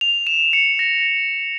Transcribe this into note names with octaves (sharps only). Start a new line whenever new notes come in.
F7
E7
C#7
A#6